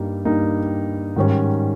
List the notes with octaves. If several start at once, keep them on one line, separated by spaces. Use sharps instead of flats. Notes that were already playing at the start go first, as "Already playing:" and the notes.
Already playing: G2 G3 A#3 D#4 G4
G2 G3 A#3 D#4 G4
G#2 D#3 G3 C#4